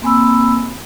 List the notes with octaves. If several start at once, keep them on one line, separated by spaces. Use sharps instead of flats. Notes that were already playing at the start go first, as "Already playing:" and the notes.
A#3 C4 G#5 B5 E6